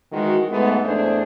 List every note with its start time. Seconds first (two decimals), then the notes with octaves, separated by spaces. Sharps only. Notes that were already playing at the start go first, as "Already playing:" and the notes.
0.12 D#3 E3 G#3 F#4
0.51 G#2 G#3 A3 B3
0.85 E2 A3 D4 G#4 C5